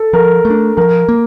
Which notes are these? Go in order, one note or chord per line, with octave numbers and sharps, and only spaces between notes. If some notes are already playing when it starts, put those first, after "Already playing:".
Already playing: A4
F3 A#4
A3
D4
F3 A#4
A#3